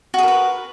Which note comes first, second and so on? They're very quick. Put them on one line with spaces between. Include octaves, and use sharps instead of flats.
F#4 G#4 A#4 B4